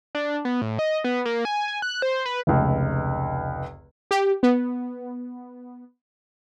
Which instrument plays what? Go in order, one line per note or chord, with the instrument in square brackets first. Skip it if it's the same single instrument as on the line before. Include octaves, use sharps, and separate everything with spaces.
[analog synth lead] D4
B3
A2
D#5
B3
A#3
G#5
G#5
F#6
C5
B4
[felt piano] F1 C#2
[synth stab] G4
B3